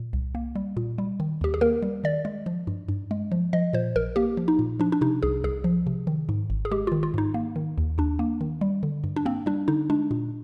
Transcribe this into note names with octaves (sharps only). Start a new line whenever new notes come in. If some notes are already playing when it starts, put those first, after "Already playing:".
Already playing: A#2
C2
A#3
G3
A#2
G3
D#3
D#2 G4
G#4
A#3 A#4
G3
D#3 D5
G#3
F3
G2
G2
G#3
F3
F3 D#5
A#2 C5
A#1 A#4
A#3 G4
F3
D#4
A#2
F3 D4
D4
C3 D#4
C2 G#4
C2 G#4
F3
C3
D#3
G#2
G#1
G#4
G#3 G4
D#3 F4
F4
G#2 D#4
A#3
D#3
D#2
D#2 D4
A#3
D#3
G3
D3
G2
D4
A#3 C4
G3 D4
D3 D#4
G#3 D4
A#2